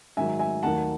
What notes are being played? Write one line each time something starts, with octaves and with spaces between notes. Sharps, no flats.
G#2 D#3 F#3 E5 G#5
E5 G#5
D#2 D#3 F#3 A3 F#5 A5